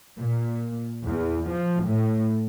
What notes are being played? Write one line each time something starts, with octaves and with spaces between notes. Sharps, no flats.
A#2
E2
F3
A2